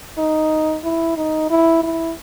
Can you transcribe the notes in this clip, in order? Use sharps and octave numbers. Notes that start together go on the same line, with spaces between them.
D#4
E4
D#4
E4
E4